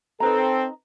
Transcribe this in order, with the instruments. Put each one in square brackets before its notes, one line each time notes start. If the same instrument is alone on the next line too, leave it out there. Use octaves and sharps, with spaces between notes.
[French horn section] C4 A4 [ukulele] D#4 B4 A#5